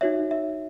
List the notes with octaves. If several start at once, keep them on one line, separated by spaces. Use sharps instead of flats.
D#4 F#4 C#5 E5
E5